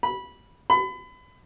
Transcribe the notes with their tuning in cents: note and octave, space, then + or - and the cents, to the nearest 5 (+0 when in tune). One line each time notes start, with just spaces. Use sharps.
B5 -15
B5 +30